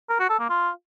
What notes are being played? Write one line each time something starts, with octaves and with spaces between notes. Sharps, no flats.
A#4
F#4
A4
A#3
F4